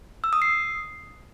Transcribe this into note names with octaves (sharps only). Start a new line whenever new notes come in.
E6
D#6
C7